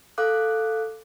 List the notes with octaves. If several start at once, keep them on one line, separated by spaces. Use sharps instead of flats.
A4 F5 D6 F#6